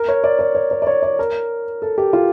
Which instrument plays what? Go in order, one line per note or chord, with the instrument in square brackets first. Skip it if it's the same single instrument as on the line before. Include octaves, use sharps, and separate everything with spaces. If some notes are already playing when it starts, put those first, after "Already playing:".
Already playing: [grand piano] A#4
C#5
D5
D5
C#5
C#5
D5
C#5
D5
A#4
A4
G4
F4